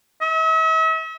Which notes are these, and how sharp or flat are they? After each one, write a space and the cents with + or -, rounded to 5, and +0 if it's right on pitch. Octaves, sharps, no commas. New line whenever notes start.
E5 -45